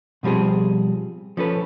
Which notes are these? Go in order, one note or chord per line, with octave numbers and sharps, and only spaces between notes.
B2 F3 G3 C4 G#4
F3 C#4 A4 B4